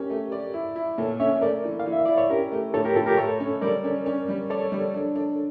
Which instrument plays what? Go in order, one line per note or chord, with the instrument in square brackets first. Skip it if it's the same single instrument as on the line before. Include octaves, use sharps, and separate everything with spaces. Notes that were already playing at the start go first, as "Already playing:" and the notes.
Already playing: [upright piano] C#4 [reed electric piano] G4 A#4
[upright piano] A3
D5
E4
E4
[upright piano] A#2 [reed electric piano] A4 C#5
[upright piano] C#4 [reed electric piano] C#5 E5
[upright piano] A3 [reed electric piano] A#4 D5
[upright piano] E3
[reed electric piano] F5
[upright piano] E3
[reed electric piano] E5
[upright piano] E4 [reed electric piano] D5
[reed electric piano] C#5
[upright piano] C#4 [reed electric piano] G4 A#4
[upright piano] A3
[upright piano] A2 [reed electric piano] A4 C#5
[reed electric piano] G4 A#4
[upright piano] A2 [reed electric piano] F4 A4
[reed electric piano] G4 A#4
[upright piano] A3 [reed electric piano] A4 C#5
[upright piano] C#4
[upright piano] G3 [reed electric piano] A#4 D5
[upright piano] C#4
C#4
G3
[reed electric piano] A4 C#5 [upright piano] D5
[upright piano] G3
D4
D4